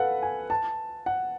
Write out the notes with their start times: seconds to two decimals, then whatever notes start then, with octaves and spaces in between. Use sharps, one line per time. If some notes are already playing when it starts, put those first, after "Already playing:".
Already playing: A4 B4 F5 F#5
0.23 G#5
0.50 A5
1.06 F#5